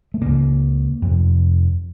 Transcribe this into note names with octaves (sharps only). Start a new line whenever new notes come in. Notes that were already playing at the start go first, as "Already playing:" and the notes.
A3
C#2 C#3 A#3
F2 C3